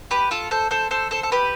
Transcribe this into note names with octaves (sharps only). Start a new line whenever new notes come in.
G4 B4
F4 A4
A4 C5
A4 C5
A4 C5
A4 C5
A4
G4 B4